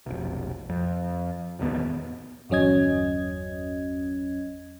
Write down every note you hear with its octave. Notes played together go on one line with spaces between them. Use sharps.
F1 B1
F2
E1 A1 D#2 B3
G1 E2 F#3 C#4 D#5 G#6